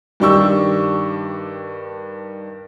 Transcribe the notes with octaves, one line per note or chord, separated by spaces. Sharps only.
G2 D#3 D4 G4 C#6 E6